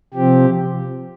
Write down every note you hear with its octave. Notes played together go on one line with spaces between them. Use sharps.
C3 F3 C4 G4